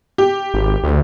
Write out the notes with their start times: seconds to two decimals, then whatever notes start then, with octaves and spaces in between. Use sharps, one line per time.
0.18 G4
0.54 G#1
0.84 D2